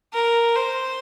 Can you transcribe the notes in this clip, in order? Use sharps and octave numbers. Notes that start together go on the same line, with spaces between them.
A#4
C5